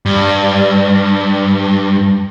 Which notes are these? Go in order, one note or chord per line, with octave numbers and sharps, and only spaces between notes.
G2